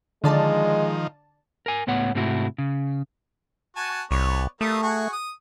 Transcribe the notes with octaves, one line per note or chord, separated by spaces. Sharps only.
D3 D#3 F3 G#3 D5 A5
A#4 G#5
C#2 A2 B3 C#5 F#5
G#2 C3 A3 E4 F#4
C#3
F#4 G#5 A5
C2 B3 C#5 D5
G3 A3 A#3 D#6
F#4 G#4 C#6
D#6